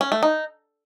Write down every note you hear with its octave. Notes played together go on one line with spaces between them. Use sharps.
C#4
A3
D#4